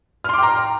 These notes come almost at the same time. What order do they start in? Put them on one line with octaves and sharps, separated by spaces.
F6 C6 D6 G5 A#5